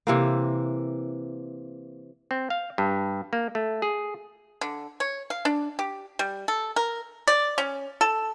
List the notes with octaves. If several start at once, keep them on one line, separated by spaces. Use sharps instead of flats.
C3 E3 A#3
C4
F5
G2
A#3
A3
G#4
D3
C#5
F5
D4
G4
G3
A4
A#4
D5
C#4
A4